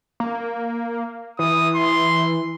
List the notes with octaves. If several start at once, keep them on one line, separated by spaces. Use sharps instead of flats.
A#3
E3 D#6
C6